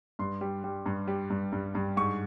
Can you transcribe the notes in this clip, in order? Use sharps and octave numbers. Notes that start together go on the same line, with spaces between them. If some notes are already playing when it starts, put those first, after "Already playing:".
G2 C6
G3
G3
G2
G3
G2
G2
G2
G#2 C#6